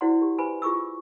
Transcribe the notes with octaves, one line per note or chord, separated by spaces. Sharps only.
E4 F#4 C5 D5 F#5 C6
G4
G4 B4 C5 G#5 B5
F4 G#4 C#6 D6 E6